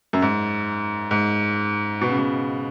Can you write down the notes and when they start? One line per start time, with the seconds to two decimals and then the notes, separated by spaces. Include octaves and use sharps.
0.13 F#2
0.22 G#2
1.11 G#2
2.01 B2
2.09 C#3
2.18 B2